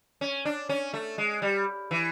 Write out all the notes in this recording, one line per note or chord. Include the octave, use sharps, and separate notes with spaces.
C#4
D4
C#4
A3
G#3
G3
E3